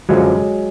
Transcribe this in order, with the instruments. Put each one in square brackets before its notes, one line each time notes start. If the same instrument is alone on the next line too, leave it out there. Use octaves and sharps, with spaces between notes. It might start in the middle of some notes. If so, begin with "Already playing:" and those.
[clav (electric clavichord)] F#2 D3 F3 F#3 G#3